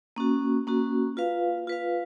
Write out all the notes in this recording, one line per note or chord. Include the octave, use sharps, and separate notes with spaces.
A#3 C#4 F#4
A#3 C#4 F#4
F4 B4 F5
F4 B4 F5